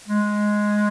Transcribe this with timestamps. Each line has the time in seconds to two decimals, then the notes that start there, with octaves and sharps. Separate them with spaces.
0.08 G#3